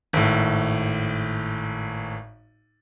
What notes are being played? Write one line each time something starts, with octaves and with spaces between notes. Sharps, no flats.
G#1 A2